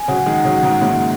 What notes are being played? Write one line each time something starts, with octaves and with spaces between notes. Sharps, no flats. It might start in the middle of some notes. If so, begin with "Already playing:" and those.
Already playing: G#5
C#3 F#3 F#5
D#3 G#3
F#5
C#3 F#3
F#5
G#2 C#3
G#2 C#3 A#3